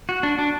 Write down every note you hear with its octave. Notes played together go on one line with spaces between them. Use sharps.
F#4
D4
D4